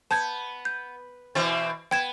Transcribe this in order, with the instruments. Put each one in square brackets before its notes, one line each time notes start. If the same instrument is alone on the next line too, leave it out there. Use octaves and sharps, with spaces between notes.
[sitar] B3 [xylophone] A5 G6 G#6
[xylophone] G6
[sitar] B2 E3 C4 [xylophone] A6
[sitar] B3 [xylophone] G5 G#6 E7